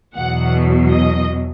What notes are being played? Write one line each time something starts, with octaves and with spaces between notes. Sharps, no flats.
E2 B2 F#3 F#5
D#5